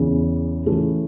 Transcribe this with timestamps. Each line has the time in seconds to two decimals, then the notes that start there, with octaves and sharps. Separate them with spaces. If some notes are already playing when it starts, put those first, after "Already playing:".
Already playing: E2 C#3 E3
0.66 C#3 E3 A3